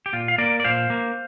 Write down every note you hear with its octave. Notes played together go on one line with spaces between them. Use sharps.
G4
A#2 F4
F5
A#3 A#4 D5
D5
A#2 C5 F5
A#3